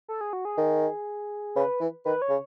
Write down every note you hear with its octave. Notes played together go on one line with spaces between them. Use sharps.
A4
G#4
F#4
G#4
D#3
C#3 B4
E3
D#3 B4
C#5
C#3